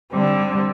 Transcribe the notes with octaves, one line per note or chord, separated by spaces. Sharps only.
D3 G3 C4